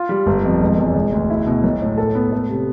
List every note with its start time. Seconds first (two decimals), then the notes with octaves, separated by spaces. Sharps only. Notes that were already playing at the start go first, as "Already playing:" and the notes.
Already playing: F4
0.09 G3
0.26 G1
0.45 F2
0.60 E1
0.78 E2
0.95 E1
1.12 D2
1.30 E4
1.47 B2
1.64 B1
1.82 A2
1.98 A4
2.15 B3
2.32 A3
2.49 C3